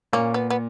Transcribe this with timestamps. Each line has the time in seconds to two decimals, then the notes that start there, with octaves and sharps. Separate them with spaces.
0.13 A#2 A#3 C#4
0.34 B3
0.50 B3